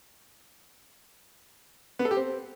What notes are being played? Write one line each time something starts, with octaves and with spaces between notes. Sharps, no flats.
B3
A4
G4
C4